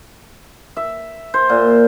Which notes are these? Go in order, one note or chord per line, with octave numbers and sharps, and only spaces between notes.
E5
C5
A#2